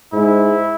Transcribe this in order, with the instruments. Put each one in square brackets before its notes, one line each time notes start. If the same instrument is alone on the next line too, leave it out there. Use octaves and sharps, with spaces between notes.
[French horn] G#2 [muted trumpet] E4